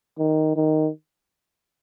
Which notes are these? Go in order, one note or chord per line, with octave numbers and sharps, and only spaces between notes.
D#3
D#3